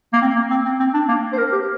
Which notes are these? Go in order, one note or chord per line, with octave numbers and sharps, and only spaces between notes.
A#3
C4
A#3
C4
C4
C4
D4
A#3
C5
A#4
G4